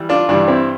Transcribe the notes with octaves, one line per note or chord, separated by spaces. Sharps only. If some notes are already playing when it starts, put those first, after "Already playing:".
Already playing: E3 G3
D4 F4
G2 E3 G3 D4
C4 E4